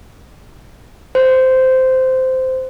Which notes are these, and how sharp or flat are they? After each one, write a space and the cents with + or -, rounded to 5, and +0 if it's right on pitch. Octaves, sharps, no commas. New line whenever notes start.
C5 -10